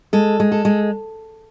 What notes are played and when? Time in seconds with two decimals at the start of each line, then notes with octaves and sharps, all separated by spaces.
0.13 G#3 A4
0.40 G#3
0.52 A4
0.65 G#3